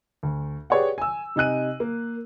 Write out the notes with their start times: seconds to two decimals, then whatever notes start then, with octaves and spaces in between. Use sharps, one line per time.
0.23 D2
0.70 G4 G#4 B4 C#5 D5 F#5
0.98 G#5 E6
1.36 C3 D#4 G#5 F#6 D#7
1.80 A#3